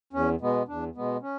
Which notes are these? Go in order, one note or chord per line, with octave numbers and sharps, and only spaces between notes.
E2 C#4
B2 G#3 B3
E2 D4
B2 G#3 B3
C#4